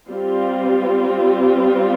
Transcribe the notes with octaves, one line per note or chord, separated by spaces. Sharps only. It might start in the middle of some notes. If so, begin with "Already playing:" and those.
G3 C4 F4